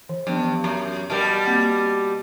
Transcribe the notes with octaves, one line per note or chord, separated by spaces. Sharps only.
E3
G2 F3 B3 C#4
F#2 A#5
B2 G3 A#4 A5
A#3 C4 F#5